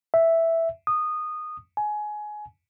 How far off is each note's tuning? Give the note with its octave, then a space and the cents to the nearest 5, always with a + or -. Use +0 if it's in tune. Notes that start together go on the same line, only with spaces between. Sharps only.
E5 +0
D#6 -15
G#5 +20